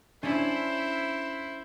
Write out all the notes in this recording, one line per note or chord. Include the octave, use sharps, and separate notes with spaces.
C#4 D4 E4 C5 G#5